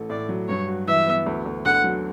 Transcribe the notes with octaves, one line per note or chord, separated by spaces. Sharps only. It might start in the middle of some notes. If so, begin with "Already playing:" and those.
Already playing: A1 A3
A2 D5
F#3
G2 C#5
F#4
E3 E5
B3
D2
D2
D3 F#5
F#3